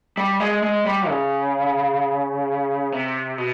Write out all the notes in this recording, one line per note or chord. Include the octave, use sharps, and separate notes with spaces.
G3
G#3
G#3
G3
C#3
C3
B2